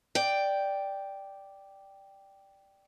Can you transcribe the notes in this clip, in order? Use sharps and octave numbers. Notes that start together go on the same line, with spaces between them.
D5 G5